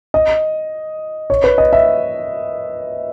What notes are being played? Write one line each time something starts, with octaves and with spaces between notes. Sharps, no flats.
D#5
C#5
B4
D#5
E5